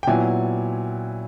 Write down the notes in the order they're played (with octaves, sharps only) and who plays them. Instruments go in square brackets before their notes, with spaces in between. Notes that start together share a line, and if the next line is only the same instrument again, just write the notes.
[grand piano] G5
A#2 F#3 B3 E4 G#5